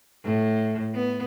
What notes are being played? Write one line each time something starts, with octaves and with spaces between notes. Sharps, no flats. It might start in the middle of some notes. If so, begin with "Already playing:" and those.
A2
B3